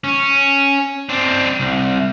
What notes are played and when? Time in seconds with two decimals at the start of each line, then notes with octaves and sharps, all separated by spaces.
0.04 C#4
1.09 C4 D4
1.60 C2